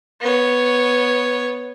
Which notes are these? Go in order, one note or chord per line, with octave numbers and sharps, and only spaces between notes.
B3 C#5